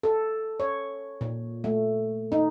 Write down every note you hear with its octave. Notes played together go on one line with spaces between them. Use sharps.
A4
C#5
A#2
A3
D#4